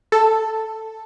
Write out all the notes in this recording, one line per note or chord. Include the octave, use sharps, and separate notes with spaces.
A4